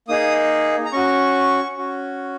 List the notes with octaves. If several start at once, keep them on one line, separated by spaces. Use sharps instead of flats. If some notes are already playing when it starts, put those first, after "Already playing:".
A#3 D#4 G#4 D#6
A#5
C#4 F#4 C#6
C#4 F#4